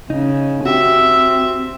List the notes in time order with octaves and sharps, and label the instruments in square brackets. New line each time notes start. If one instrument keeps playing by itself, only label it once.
[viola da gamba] C#3 [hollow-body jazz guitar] D#4
[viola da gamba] C4 [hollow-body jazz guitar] F#4 G4 [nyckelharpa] E5